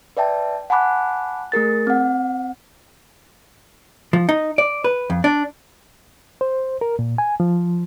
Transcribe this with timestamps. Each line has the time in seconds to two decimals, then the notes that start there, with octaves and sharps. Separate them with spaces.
0.17 B4 D5 E5 G5 A5
0.70 F#5 G#5 A5 B5 D6 F#6
1.52 A3 G#4 A#4 A6
1.87 C4 F#5
4.13 F3
4.29 D#4
4.58 D5
4.84 B4
5.10 F2
5.24 D4
6.41 C5
6.81 A#4
6.99 A#2
7.18 G#5
7.40 F3